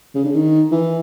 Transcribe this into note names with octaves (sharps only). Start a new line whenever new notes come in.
C#3
D3
D#3
E3